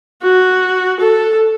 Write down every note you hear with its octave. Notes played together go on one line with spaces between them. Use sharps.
F#4
A4